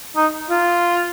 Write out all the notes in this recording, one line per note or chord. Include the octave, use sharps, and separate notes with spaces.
D#4
F4